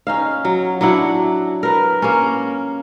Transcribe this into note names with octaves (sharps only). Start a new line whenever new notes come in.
C#4 D#4 F5
F#3
F#3 D4 E4 F#5
A#4 B4
A#3 C#4